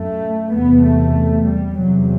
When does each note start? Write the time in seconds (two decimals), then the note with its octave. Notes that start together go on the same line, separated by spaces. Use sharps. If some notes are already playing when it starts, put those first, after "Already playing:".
Already playing: F#2 A3
0.54 E2 C3 B3
0.84 A3
1.46 G3
1.76 E2 C3 F#3